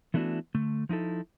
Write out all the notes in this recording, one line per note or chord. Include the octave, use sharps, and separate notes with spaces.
E3 A3 B3 D4 E4 F#4
D3 A3
F3 D#4 E4 A4